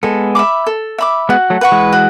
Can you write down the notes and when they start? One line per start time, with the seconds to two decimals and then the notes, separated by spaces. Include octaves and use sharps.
0.03 G#3 B3 A4
0.35 E5 B5 D6
0.67 A4
0.98 E5 B5 D6
1.29 G#3 B3 F#4
1.50 F#3 A3
1.61 B4 F#5 C#6
1.72 E3 G#3
1.93 F#4